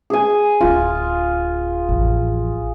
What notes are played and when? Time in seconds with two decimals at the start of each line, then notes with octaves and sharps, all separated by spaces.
0.10 G#4 G#5
0.61 D1 D2 F4
1.89 A1 F2